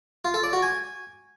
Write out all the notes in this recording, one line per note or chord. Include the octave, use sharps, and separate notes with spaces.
F4
A4
D5
F#4
G#5